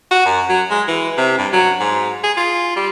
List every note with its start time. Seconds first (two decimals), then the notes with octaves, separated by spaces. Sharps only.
0.11 F#4
0.25 F#2
0.49 F#3
0.71 G#3
0.88 E3
1.17 C3
1.38 G2
1.53 F#3
1.80 G#2
2.24 G#4
2.37 F4
2.76 G3